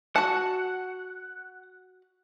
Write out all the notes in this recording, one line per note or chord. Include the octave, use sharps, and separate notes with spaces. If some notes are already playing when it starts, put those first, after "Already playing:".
F#4 F#5 A5